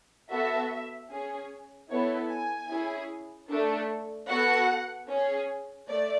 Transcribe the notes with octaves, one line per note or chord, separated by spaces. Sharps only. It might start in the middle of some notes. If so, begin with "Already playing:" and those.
B3 F#4 A4 E5
C#4 G#4
B3 E4 A4 C#5
G#5
C#4 E4 G#4
A3 D4 A4
B3 F#4 A4 F#5
C#4 G#4
A3 D5